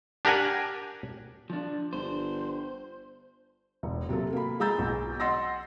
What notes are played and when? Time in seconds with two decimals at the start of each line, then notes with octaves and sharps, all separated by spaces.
0.25 D4 G4 A#4 F#5 G#5
1.50 F3 D4
1.93 G1 C5
3.83 E1
4.09 C3 F#3 A#3 A4
4.33 A#3 B5
4.60 G#3 G#4 A#5 E6 G6 A6
4.79 B1
5.20 D#5 F#5 C6 E6 A6 A#6